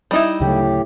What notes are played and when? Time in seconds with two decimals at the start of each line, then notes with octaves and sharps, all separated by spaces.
0.11 G3 D#4 E4
0.40 D2 A2 C#3 F#3 G4